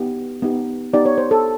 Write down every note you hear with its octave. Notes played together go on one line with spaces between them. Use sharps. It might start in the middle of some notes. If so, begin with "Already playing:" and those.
Already playing: B3 D#4 G4
B3 D#4 G4
B3 D#4 G4 D5
C#5
C5
A4